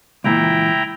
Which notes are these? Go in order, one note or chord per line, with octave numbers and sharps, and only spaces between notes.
C#2 A#2 E3 E4 G5 A#5